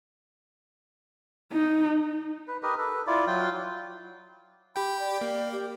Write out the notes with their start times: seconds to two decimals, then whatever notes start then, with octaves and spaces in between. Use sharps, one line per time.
1.52 D#4
2.48 B4
2.63 G4 A#4 B4 D#5
2.78 A4 B4
3.07 E4 F4 D5
3.27 F#3 F4 G5
4.76 G4 G5 B5
5.00 D5
5.21 A#3
5.52 G4